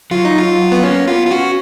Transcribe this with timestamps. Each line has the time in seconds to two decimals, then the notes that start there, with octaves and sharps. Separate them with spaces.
0.11 F#3 F4
0.25 D#4
0.38 F4
0.72 B3
0.83 A#3 C#4
1.07 B3 F4
1.27 F4
1.31 C#4 F#4